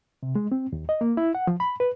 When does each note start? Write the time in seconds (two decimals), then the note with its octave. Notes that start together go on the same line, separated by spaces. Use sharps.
0.23 C3
0.35 G#3
0.52 C4
0.73 D#2
0.89 D#5
1.01 A#3
1.17 E4
1.35 F#5
1.47 F3
1.60 B5
1.80 B4